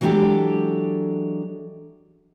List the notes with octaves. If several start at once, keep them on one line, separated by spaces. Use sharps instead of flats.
E3 F#3 G#3 D4 G4 A4